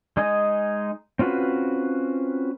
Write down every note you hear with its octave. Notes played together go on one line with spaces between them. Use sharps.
G#3 D#4 D#5 G#5
C4 C#4 F4 F#4 B4